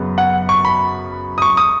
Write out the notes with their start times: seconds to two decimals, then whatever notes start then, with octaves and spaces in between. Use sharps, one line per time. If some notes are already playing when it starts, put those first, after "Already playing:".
Already playing: F#2 C#3 B3
0.18 F#5
0.49 C#6
0.65 B5
1.38 D#6
1.42 C#6
1.57 D#6